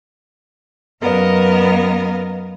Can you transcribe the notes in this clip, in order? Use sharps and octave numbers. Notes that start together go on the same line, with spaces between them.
F#2 B3 A#4 D#5 F5